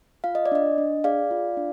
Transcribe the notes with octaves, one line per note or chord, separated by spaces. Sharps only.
F4 F5
D#5
D5
D4 D#5
D4
G#4 D5 F5
F4
D4